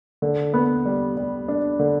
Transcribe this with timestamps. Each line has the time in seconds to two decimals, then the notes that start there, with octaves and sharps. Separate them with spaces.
0.22 D3
0.54 B3
0.85 G3
1.17 G3
1.48 D4
1.79 D3